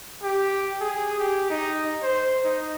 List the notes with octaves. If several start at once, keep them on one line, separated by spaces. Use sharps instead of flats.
G4
G#4
G4
D#4
C5
D#4